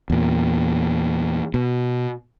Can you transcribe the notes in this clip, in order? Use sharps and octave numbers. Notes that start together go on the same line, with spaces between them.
E2 A#2
B2